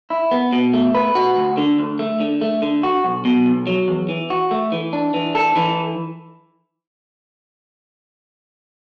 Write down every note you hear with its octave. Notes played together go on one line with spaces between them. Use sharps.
E4
B3
B2
A3
B4
F#4
D2
D3
D2
A3
D3
A3
D3
F#4
B1
B2
B1
F#3
E2
E3
F#4
A3
E3
D4
E3
A4
E3